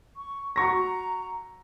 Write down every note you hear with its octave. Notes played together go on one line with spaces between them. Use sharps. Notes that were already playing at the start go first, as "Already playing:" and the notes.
C#6
F#4 A#5 C#6 A#6